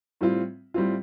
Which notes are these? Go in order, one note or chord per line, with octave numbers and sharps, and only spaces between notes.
A2 G3 C4 F4
A2 G3 C4 F4